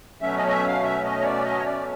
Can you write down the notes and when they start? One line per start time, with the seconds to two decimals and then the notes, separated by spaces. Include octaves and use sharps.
0.21 B2 F#3 A3 C#4 E5
0.37 D#5
0.47 D#5
0.52 E5
0.68 F5
0.83 E5
1.04 D#5
1.21 C#5
1.24 D5
1.45 D#5
1.58 C#5
1.66 D5